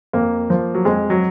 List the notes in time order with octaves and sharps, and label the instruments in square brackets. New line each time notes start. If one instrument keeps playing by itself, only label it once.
[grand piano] F2 A#3
F3
F#3
F2 G#3
F#3